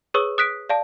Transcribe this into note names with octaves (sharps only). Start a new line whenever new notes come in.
G#4 B4 C#5 C#6 D#6 E6
D#6 F#6 B6 D7
D5 F5 A5